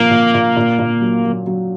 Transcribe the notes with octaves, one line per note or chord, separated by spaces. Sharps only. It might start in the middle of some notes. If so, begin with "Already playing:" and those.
Already playing: A#2 F3 A#3
A#2
A#2
A#2
A#2
F#3
F#3
F#3